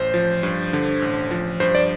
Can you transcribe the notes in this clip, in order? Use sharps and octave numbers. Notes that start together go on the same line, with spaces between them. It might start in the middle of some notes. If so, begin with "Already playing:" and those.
Already playing: A1 C5
F3
G2
D3
A1
F3
G2 C5
D5